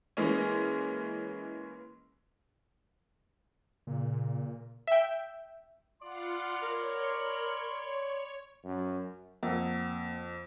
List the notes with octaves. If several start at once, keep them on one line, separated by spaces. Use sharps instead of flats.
E3 G#3 A#3 C#4
A#2 C#3
E5 G5
F4 D5 F5 F#5 B5 C6
A#4 C#5
F#2
F2 A#3 F#5 E6